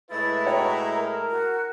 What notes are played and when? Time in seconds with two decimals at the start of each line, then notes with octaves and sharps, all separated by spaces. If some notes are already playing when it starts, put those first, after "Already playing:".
0.10 A2 G#3 E4 B4 A6
0.46 F#4 C#5 G5 A#5
0.97 A#4
1.30 F#4